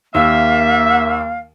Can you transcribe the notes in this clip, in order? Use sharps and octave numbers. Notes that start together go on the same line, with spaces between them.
D#2 A#3 E5 F5